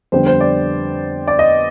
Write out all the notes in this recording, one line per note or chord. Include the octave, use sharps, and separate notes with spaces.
F2 D3 G3 B3 C5
C5
D5
D5
D#5